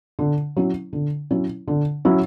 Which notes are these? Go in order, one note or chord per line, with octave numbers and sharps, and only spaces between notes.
D3
F#3 C#4 E4
D3
F#3 C#4 E4
D3
F#3 C#4 E4